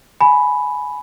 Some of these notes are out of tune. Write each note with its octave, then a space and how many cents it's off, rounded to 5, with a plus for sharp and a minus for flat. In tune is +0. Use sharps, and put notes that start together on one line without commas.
G#5 +15 B5 +0